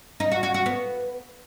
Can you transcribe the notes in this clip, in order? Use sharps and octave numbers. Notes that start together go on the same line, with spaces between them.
D#4
F#4
F#4
F#4
B3